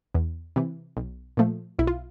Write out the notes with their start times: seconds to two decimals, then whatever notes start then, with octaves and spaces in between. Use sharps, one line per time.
0.15 E2
0.56 C3 E3
0.97 B1
1.37 A#2 F3 A3
1.79 B1 E4
1.87 F4